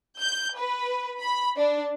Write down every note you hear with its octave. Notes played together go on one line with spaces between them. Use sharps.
G6
B4
B5
D4